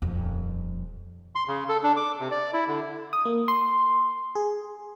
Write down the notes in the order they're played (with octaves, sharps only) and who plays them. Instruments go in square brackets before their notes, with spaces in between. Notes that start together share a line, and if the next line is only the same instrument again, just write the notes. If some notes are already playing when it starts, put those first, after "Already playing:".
[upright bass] D#1 F2
[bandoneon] C6
C#3
A4
D4
D6
C3
D5
E4
D3
[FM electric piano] D#6
A#3
C6
G#4